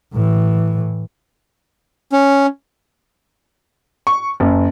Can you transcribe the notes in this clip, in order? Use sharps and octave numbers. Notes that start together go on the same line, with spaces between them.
A2 E3
C#4
C#6
F#1